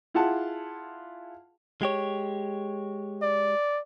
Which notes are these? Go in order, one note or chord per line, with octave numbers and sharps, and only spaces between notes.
E4 F4 G#4 F#5 A5
G#3 G4 C#5
D5